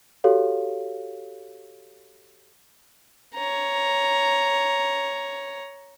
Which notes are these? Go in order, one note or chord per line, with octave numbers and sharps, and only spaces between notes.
F#4 G4 A4 C#5 F5
C#5 A#5